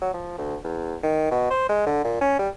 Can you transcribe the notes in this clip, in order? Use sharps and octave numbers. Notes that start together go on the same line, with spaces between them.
F#3
F3
D2
E2
D#3
B2
C5
G#3
D3
A#2
C#4
G3